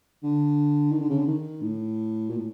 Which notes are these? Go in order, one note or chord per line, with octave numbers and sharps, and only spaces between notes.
D3
D#3
D3
C#3
D3
D#3
A2
A#2
A2